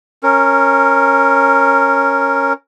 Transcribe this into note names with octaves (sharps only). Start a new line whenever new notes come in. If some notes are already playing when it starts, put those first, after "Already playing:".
C#4 A#4